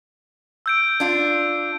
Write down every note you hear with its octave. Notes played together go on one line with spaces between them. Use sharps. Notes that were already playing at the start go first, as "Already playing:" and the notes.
E6 G6 D7
D4 F4